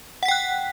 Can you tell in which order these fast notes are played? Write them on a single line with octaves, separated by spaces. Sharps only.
F#5 B6 G5 F#6